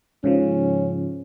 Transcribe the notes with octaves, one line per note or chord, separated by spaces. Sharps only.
G#2 C#3 F3 C#4